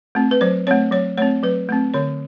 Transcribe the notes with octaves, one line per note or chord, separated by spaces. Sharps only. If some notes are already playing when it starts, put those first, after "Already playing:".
A3 C4
B4
F#3 C5
A3 C4 C#5
F#3 C#5
A3 C4 C#5
F#3 B4
A3 C4
D3 C#5